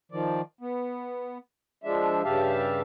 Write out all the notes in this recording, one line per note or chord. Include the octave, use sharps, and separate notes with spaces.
D#3 F3 D5
B3
F3 G#3 D4 E5
G2 C#3 G4 E5 F5 A5